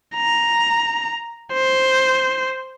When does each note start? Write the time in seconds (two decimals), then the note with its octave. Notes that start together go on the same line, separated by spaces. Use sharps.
0.16 A#5
1.53 C5